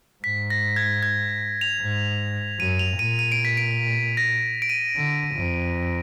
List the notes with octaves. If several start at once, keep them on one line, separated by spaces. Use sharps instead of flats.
G#2 B6
A#6
G#6
G#6
F7
G#2
F#2 D#7
F7
A#2 D#7
D#7
D7
B6
D7
A#6
D7
D#7
D3
F2